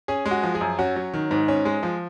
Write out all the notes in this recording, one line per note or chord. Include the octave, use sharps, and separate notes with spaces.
C#4 G#4
G#3
F#4
F3
G#4
F#2
C#4 F#4
F#3
D#3
G#2
C#4
G#3
F3